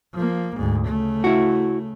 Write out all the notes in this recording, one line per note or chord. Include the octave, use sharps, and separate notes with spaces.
F3 A#3
D2 G#2
C#3 A3
E4 F#4